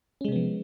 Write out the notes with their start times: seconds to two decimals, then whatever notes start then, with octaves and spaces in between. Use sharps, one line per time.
0.21 C#4
0.25 G#3
0.28 C3
0.32 B3
0.36 F3